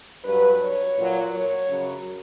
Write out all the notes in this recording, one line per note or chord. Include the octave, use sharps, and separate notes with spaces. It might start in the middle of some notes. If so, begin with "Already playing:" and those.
G2 F#3 B4
C#5
A#2 F#3
C#5
F#2 C#3 F#3